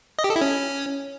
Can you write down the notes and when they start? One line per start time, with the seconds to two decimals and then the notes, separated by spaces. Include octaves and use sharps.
0.19 D#5
0.24 G4
0.30 A4
0.36 E4
0.41 C#4